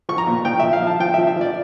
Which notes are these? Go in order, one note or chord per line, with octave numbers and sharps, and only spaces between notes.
F3 C#6
A#5
A#2
F3 G5
F3 E5
F5
F3 A5
F3 G5
E5
F3
E5
F3 D5